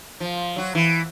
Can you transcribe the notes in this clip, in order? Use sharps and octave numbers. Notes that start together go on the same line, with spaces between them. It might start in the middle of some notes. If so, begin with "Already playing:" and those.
F3
F#3 F#4
E3